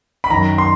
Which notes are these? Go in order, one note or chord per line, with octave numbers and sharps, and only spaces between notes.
B5
F#2 D#3 A#5
C6